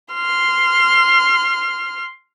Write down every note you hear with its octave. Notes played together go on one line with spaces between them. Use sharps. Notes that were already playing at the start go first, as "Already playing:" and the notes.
C6 F6